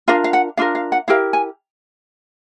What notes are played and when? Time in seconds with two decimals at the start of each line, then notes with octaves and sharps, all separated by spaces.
0.08 D4 F4 A#4 F5
0.24 F5
0.33 F#5
0.57 D4 F4 A#4 F5
0.75 F5
0.92 F#5
1.08 E4 G4 A#4 F5
1.33 G#5